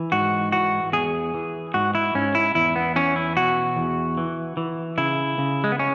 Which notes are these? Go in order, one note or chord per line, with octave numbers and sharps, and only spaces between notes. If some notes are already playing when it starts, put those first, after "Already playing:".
Already playing: E3
G#2 F#4
E3 F#4
E2 G#4
E3
G#2 F#4
E4
G#2 C#4
E4
E2 E4
B3
E3 C#4
E4
B2 F#4
E2
E3
E3
C#3 E4
C#3
G#3
B3
C#4